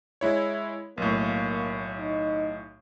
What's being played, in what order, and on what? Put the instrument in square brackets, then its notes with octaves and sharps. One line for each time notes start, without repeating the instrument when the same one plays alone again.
[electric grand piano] G#3 E4 C#5
[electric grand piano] B1 A2 [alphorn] A#3
[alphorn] D#4